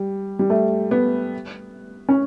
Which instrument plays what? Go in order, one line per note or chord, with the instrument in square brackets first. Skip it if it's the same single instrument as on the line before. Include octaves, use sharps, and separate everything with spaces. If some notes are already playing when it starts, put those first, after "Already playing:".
Already playing: [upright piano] G3
G3
A3
B3
C#4